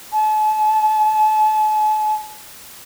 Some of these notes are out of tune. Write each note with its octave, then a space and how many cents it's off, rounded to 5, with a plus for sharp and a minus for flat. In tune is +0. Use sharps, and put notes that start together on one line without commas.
A5 -40